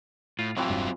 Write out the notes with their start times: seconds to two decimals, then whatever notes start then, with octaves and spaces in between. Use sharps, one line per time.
0.39 A2 F4
0.57 A2 C3 E3 F#3 C4 F4
0.70 E1 G2